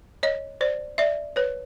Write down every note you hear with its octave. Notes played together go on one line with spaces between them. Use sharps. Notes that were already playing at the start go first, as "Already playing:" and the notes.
C#5 D#5
C5 D5
D5 E5
B4 C#5